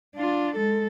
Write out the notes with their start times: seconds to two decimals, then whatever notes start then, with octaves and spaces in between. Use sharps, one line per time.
0.16 D4 F4
0.56 G#3 A4